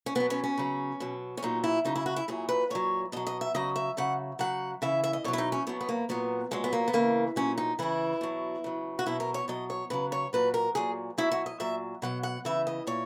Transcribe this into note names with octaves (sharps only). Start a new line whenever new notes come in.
C#4
B2 F#3 B3
C#4
C#4
C#3 F#3
B2 F#3
C#4
A#2 F#3 D#4
E4
C#3 F#3 D#4
E4
F#4
E4
A#2 F#3 G#4
B4
A#2 F#3 C#5
B2 F#3 D#5
D#5
E5
C#3 F#3 D#5
E5
C#3 F#3 F#5
C#3 F#3 F#5
C#3 E3 E5
E5
D#5
B2 F#3 C#5
E4
D#4
C#4
B2 F#3 B3
B3
A#3
A#2 F#3 B3
A#2 F#3 G#3
B3
A#3
B3
C#3 E3 A#3
A#2 F#3 C#4
D#4
C#3 E3 E4
B2 F#3
C#3 F#3
F#4
B2 F#3 E4
A#4
C#5
B2 F#3 D#5
C#5
C#3 F#3 B4
C#5
A#2 F#3 B4
A#4
A#2 F#3 G#4
B2 F#3 E4
F#4
D#5
A#2 F#3 E5
B2 F#3 F#5
F#5
C#3 E3 E5
D#5
A#2 C#5